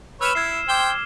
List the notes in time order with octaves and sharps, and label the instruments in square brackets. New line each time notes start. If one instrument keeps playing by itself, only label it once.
[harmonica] B4 C#5 B5 [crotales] E6 F6 E7
[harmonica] E4 [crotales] G#6 C7
[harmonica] C5 G5 [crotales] D6 C7 G7